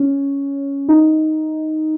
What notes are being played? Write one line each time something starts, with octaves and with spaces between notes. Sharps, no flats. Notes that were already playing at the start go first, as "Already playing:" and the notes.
Already playing: C#4
D#4